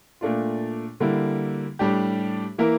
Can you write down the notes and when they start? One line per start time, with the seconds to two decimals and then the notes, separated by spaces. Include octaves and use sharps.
0.21 A#2 A3 D4 F4
1.00 D3 G3 A#3 E4
1.79 A2 G3 D4 G4
2.58 E3 A#3 E4 A#4